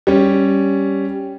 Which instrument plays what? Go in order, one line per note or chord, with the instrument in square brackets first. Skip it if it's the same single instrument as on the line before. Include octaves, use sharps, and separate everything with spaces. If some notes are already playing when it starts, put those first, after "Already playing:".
[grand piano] G3 C#4